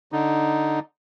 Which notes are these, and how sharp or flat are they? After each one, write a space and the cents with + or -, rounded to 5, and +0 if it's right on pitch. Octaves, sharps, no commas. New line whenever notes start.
D3 +0 D#4 +0